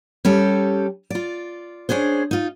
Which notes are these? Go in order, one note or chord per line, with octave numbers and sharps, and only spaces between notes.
G3 C#4 G4 A4
F4 D5
C#4 D4 G#4 C5
D#4 F4